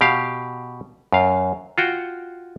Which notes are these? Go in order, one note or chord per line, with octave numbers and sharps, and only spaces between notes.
B2 G4 F5
F#2 F5
F4 F#4 G5